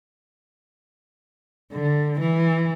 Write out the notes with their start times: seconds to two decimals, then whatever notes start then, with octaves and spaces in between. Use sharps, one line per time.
1.73 D3
2.20 E3